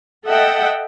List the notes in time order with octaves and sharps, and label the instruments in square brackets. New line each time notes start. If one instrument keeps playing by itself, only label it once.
[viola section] A4 D#5 E5 F#5 G5